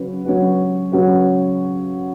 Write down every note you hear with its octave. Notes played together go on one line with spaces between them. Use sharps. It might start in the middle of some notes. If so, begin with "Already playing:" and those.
Already playing: C#3 F#3 C#4 F#4 B4
C#3 F#3 C#4 F#4 B4
C#3 F#3 C#4 F#4 B4